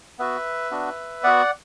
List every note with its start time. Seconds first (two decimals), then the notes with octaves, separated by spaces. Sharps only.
0.19 B3 F#4 B4 E5
0.71 B3 D4 F#4
1.24 B3 F#4 D5 F#5